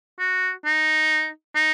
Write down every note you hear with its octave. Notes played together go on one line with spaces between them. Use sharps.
F#4
D#4
D#4